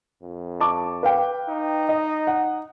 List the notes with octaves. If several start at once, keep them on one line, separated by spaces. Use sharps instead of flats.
F2
A5 C#6 D6
B4 F5 G5
D#4
D#5
F#5